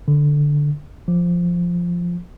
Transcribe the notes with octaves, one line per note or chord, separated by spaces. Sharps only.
D3
F3